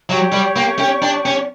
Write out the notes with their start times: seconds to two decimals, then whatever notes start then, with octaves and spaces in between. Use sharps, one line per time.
0.09 F#3 G4 C#5 G5 C#6
0.32 G3
0.56 A#3
0.79 C#4
1.02 D4
1.26 C#4